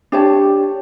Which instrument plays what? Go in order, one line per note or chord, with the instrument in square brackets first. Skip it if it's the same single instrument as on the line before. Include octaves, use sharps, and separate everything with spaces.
[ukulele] D4 G4 C#5 A5